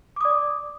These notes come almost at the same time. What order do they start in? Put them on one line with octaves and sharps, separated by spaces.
D6 D#6 D5